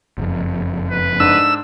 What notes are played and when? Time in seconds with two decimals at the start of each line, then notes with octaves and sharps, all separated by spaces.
0.18 F#1 F2
0.91 B4
1.20 G#2 D4 E6